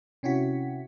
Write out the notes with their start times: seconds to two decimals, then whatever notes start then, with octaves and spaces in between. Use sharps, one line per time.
0.23 C3 C#4 E4 F#4 B6